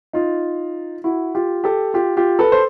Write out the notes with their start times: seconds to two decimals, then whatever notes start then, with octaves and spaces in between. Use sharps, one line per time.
0.13 D#4 F4
1.04 E4 F#4
1.35 F4 G4
1.64 G4 A4
1.94 F4 G4
2.17 F4 G4
2.39 A4 B4
2.52 C5